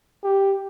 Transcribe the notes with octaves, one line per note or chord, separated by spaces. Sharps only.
G4